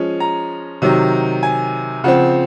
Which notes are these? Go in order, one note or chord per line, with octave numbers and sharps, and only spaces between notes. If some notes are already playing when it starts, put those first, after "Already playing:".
Already playing: F3 G#3 C#4
A#5
C3 D#3 F#3
G#5
C#3 F3 C4 F#5